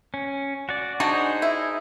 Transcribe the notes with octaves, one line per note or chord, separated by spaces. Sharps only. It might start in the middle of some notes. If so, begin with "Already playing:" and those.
C#4
F#4 D5
D4 D#4 F#4 G#4 C5
E4